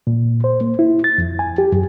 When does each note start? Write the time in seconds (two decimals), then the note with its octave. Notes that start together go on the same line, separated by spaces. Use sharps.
0.07 A#2
0.44 C5
0.61 A#3
0.79 E4
1.04 A6
1.18 F2
1.39 G#5
1.58 G4
1.72 F#2